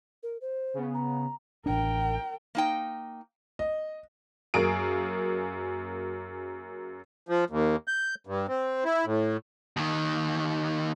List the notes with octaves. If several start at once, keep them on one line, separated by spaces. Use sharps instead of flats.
A#4
C5
C#3 B3
A#5
A1 D4 A#4 G5
A#3 D#4 G5
D#5
F#2 A#3 G#4 D7
F3
D#2
G6
G2
C4
E4
A2
D#2 D#3